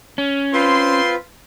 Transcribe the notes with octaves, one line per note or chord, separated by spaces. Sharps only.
C#4
C4 F4 B4 C5 C6